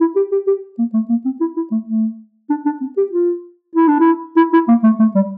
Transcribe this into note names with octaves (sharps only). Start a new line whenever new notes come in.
E4
G4
G4
G4
A#3
A3
A#3
C4
E4
E4
A3
A3
D4
D4
C4
G4
F4
E4
D4
E4
E4
E4
A#3
A3
A3
G3